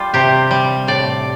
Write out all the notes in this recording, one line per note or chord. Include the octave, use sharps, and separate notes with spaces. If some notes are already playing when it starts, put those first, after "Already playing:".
Already playing: G3 F4
C3 G4
G3
A2 D5